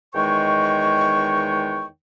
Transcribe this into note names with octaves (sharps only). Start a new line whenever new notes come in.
E2 D#3 G#3 C#5 G5 C#6